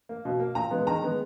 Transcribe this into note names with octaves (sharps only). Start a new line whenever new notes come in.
A#3
B2
A#3
A#2 A#5
G#3 B3
D#3 A#5
G#3 B3